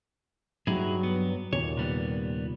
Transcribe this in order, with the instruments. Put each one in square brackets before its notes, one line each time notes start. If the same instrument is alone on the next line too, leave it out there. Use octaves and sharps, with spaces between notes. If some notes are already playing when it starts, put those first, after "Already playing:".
[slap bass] G2 [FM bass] F#3 [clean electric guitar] D#4 E4 G#4
[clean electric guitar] B3
[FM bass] D#2 [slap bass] A#2 [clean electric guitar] C#5
[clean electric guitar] C3 G3 B3